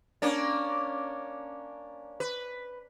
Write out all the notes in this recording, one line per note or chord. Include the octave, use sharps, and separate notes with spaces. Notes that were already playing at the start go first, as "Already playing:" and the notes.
A#3 C#4 D4
B4